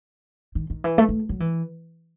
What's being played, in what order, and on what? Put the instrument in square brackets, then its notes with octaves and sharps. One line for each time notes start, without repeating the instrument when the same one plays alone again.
[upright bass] D#3
D#3
E3
A3
A3
F#3
E3